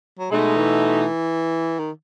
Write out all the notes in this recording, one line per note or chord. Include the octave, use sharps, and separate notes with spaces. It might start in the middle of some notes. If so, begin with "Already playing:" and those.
F#3
B2 G#3 A3 D#4
E3
D#3